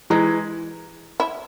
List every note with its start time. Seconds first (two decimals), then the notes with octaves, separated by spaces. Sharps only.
0.10 E3 G#3 D#4
1.20 E4